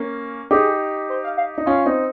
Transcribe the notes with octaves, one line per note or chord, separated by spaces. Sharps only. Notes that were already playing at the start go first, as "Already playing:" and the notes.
Already playing: A#3 C#4
D#4 G4 G#4
C5
F5
F5
D#4
C#4 F4 F5
C4 D#4